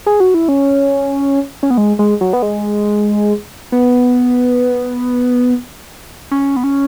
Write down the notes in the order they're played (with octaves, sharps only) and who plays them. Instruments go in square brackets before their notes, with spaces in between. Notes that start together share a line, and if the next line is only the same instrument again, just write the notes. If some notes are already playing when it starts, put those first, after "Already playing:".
[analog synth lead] G#4
F#4
E4
C#4
C#4
B3
G#3
G#3
F#3
B3
G#3
B3
C#4
B3
C#4